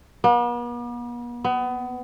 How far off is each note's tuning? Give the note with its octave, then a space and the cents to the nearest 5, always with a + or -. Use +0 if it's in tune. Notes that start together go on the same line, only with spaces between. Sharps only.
B3 -45
B3 +25